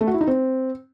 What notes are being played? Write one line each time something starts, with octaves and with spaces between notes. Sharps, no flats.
A3
F#4
E4
D#4
C4